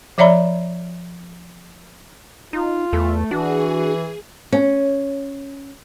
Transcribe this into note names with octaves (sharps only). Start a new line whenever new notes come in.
F3 C#5 D5 E5 A#5 B5
D#4 F4
E2 A3
E3 D4 F#4 G#4
C#4